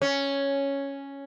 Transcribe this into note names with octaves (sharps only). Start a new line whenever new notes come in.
C#4